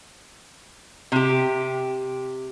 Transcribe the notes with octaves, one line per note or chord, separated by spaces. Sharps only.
C3 G4